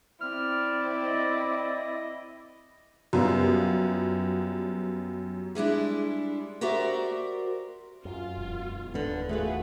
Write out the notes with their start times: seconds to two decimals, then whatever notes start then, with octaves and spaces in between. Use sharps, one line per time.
0.21 C4 E4 D5 F6
1.06 D#5
3.13 F#2 G3 B3 F4
5.55 G3 G#3 D4 E4
6.61 F#4 G4 A#4 C5 D5 E5
8.05 F#2 F4
8.37 E1
8.94 D#2 D3 E3 B3
9.29 A3 F4 F#4 G#4 A4 B4